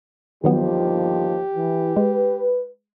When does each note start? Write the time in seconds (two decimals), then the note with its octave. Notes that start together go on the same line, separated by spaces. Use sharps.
0.44 G1 D#2 D#3 F3 F#3 B3 G4
1.54 E3
1.96 G#3 B4